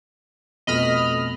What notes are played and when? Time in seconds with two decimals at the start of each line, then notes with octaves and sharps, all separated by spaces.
0.67 F2 B2 A3 D#5 B5 F6